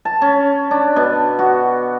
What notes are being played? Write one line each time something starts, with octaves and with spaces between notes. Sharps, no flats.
A5
C#4
D4
B2
F#4